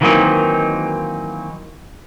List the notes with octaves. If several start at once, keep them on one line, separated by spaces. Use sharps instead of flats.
D#3 E3 F#3 A#3 C4 D#4